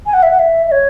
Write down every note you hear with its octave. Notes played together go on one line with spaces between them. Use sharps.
G#5
F#5
E5
F#5
E5
E5
C#5